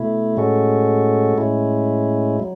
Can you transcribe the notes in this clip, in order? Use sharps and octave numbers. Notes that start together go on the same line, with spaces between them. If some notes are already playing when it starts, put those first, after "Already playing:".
Already playing: B2 A3 E4
A2 G#3 C#4 F#4 A4
A2 G#3 C#4 E4
F#3